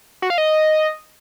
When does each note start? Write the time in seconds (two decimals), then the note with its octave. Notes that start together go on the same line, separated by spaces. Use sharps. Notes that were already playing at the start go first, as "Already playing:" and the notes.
0.22 F#4
0.30 F5
0.38 D#5